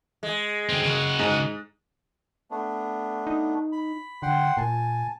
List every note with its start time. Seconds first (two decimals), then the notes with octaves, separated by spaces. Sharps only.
0.23 G#3
0.69 D3 C4
0.82 C#3 F#4
1.19 G#2
2.51 A3 B3 D4
3.27 D#4
3.72 B5
4.22 D3 F#5 G5 C6
4.57 A#2 G#5 A5